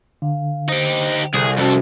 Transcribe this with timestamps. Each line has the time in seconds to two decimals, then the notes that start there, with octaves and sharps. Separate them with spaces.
0.22 D3 F5
0.69 D#4 G4 C5
1.34 C2 G#4 A4
1.58 F2 C#4 F#4 A4